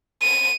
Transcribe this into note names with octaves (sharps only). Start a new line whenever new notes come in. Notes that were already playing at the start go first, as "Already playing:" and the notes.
D#7